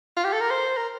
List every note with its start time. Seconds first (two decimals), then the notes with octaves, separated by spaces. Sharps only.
0.17 F4
0.25 G4
0.33 A4
0.41 A#4
0.50 C5
0.77 A#4